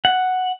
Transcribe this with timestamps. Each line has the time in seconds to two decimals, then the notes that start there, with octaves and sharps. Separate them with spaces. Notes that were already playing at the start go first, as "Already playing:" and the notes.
0.05 F#5